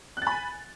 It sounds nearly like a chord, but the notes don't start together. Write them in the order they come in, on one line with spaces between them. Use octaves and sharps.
F#6 A6 B5 G#5